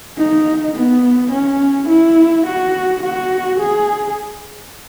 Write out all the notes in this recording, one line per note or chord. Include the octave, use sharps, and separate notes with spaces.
D#4
B3
C#4
E4
F#4
F#4
G#4